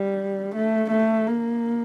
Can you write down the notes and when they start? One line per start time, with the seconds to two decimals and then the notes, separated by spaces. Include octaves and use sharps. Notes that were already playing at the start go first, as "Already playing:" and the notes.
Already playing: G3
0.55 A3
0.91 A3
1.27 A#3